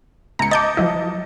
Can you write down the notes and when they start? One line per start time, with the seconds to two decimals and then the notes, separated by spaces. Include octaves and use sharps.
0.39 C#2 A#5 C#7
0.51 D#5 A5 D6 G6 A6
0.77 F3 F#3 E4